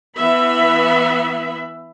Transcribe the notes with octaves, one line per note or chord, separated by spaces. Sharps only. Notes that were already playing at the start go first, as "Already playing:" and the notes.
E3 B3 E5 B5